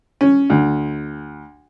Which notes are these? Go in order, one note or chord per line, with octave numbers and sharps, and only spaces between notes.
C#4
D2